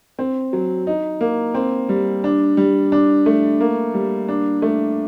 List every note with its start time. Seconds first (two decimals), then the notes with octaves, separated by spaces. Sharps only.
0.19 C4
0.53 F#3
0.87 D#4
1.21 A#3
1.54 C4
1.89 G3
2.24 D4
2.57 G3
2.92 D4
3.26 A3
3.60 A#3
3.94 G3
4.28 D4
4.62 A3